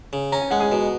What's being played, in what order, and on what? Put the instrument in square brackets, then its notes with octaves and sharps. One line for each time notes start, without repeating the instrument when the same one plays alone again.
[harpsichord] C#3
[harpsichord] C#4 [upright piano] A#5
[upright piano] G#5
[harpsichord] G#3 [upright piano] F#5
[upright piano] G#4 G#5
[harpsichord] B2